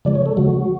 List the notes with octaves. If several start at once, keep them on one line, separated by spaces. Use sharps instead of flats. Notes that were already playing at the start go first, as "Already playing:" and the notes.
C#3 F3 G#3 D5
C#5
A4
C#3 F3 G#3 F#4